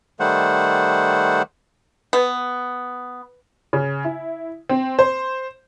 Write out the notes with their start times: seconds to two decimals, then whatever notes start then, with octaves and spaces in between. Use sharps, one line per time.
0.20 D#3 G3 A3 C5 F#5
2.13 B3
3.73 C#3
4.04 E4
4.69 C4
4.99 C5